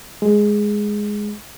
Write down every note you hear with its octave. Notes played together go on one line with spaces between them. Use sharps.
G#3